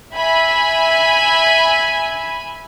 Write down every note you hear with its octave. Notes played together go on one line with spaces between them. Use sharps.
E5 G#5 B5